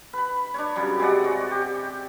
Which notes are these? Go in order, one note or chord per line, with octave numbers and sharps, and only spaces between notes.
B4 B5
D4 B4 C#5
C#3 F#3 G3
C3 G#3 D5 F#5
F#4
G4